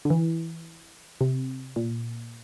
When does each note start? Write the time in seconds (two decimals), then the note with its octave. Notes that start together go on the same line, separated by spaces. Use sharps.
0.05 D3
0.10 E3
1.21 C3
1.76 A#2